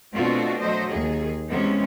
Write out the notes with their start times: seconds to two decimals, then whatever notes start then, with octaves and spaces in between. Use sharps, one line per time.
0.13 B2 A3 C4 D4 F4 F#4
0.60 F#3 A3 C5 D#5
0.92 D#2 G#4
1.50 C3 E3 G#3 B3 C#4